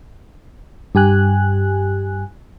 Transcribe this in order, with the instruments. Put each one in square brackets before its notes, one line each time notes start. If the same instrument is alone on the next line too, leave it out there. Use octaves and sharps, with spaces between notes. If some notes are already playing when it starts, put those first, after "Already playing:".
[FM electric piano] G2 G4 G#5 F#6